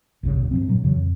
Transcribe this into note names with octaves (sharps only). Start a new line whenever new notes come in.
A1 E2 G2 C#3
D1 B1 B2
G2 F3 C4
G2 A#2 F3 F#3
E2 C#3 E3 F#3
F2